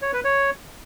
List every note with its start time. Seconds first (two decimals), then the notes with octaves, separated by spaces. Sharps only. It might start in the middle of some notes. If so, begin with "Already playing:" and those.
0.02 C#5
0.13 B4
0.24 C#5